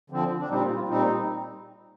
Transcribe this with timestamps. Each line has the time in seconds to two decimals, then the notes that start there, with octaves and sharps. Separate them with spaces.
0.10 D3 F3 C4
0.40 D4
0.49 A#2 G3 C4 D#4
0.62 F4
0.75 F4
0.88 A#2 G3 C4 D#4